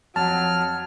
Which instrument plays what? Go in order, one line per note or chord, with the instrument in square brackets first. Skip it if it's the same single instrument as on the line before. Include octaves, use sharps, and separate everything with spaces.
[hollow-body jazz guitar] F2 [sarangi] F#3 [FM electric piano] A5 [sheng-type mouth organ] F6